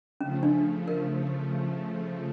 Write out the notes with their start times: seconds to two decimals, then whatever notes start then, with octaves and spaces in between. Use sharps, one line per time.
0.21 C#3 F3 A3 C#4
0.43 D4
0.88 A#4